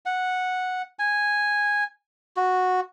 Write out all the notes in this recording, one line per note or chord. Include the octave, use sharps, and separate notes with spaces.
F#5
G#5
F#4